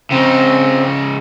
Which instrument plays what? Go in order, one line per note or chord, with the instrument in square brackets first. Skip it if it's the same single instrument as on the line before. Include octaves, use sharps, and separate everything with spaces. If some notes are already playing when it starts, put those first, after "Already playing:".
[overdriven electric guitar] C#3 D#4 [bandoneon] C4